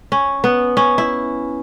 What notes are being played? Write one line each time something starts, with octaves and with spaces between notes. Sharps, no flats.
C#4
B3
C#4
E4